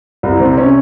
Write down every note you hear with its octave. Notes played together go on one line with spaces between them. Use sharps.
C2
C3
C#4